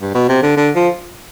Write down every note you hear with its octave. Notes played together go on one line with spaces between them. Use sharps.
G2
B2
C3
D3
D3
F3